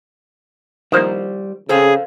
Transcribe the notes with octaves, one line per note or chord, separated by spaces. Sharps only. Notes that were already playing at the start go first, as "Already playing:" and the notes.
D#3 F3 G3 A#3 C5
C#3 G#4 A4 C5 F5